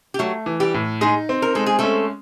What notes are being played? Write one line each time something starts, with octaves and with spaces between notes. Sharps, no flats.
G4
F#3 A3 F#4
E3
G3 G4
A2
G#3 D#4 G#4
C4
A#4
G#3 A4
G#4
A3 C#4 A4